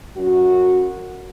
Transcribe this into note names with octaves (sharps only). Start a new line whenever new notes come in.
F#2 F#4